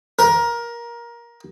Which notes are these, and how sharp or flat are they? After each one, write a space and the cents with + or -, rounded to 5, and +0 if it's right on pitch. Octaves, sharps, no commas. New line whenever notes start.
A#4 +20